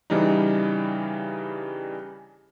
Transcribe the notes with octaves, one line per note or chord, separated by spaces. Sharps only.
C#3 E3 G3 D4 D#4